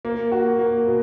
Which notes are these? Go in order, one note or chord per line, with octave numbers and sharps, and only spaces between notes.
A#3
F#4
A#3
B2